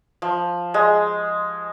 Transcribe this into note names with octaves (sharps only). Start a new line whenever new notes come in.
F3
G#3